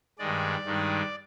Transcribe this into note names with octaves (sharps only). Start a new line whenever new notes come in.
G2 D#3 G#3 D5
G2 D#3 G#3